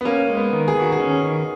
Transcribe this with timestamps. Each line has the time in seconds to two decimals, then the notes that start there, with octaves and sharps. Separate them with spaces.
0.01 B3
0.05 A#3 C#4
0.30 G#3
0.37 B3
0.53 D#3
0.68 G#4
0.76 D#3 F#4
0.92 G#4
1.00 C#4
1.23 D#3